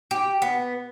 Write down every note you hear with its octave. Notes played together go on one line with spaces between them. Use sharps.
G4
B3